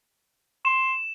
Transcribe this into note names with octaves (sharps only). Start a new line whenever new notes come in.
C6 E7